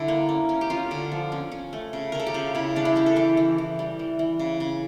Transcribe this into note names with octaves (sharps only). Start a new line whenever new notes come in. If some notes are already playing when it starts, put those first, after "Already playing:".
Already playing: D3 G3 D4 E4
A#3
C#4
C#4
G4
C#4 F4
D3
F3
C#4
C#4
A3
C#3
C#3 A#4
A4
G4
C#3 F4
C#3 E4
G3 D4
E4
C#4 G4
A4
E3 G4
E3
E3
G3
E3
E3
C#3
C#3